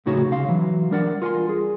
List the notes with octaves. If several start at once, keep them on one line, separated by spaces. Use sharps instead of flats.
F2 A2 C#3 D#4 F#4 C#5
C#2 C#3 F5 C6
E3 F#3
G3 D4 A#4 D5 F#5
F4 A#4 F#5 G#5 C6
G#4